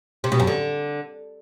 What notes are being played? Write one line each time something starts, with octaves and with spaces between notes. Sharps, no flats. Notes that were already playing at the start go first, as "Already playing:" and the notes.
C3
B2
F#2
D3